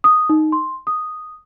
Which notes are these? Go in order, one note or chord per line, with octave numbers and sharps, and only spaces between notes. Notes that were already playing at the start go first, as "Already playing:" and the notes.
D#6
D#4
C6
D#6